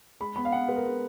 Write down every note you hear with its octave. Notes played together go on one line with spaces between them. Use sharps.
G#3 B5
B3 B5
F5
B3 F#5
G#3 B4
A#4
G#3